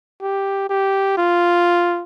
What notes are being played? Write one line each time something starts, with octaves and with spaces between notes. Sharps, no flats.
G4
G4
F4